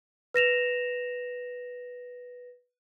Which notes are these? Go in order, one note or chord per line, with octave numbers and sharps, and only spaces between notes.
B4 A#6 E7 F7